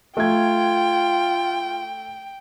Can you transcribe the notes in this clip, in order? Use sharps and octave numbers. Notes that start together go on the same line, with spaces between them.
A3 F4 G5 G#6